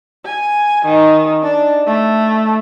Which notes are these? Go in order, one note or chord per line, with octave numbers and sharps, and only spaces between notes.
G#5
D#3
D4
A3